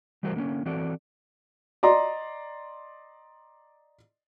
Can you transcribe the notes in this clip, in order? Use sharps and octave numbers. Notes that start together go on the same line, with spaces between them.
E3 G3 A3 F#4 A#4 C5
D3 A#3 B3 C#4
E3 C4 F#4 A4 D5
D5 D#5 A#5 C6